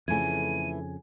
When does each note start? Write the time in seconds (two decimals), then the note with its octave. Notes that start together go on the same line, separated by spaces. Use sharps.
0.08 F2 C#3 E3 A3 E4 G#5 G#6 D#7